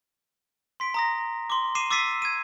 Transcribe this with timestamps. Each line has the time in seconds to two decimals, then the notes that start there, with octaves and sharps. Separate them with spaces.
0.80 C6 B6 D7
0.94 A#5 D#6 A#6
1.50 C6 D6
1.75 D6 C7 D#7 E7
1.90 D6 E6 A6 B6 C7 D#7
2.22 G#6 D#7